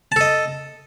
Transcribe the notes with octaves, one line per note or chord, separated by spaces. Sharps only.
A4 D#5 A5